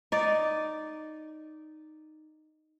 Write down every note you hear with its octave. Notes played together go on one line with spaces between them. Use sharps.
D#4 D5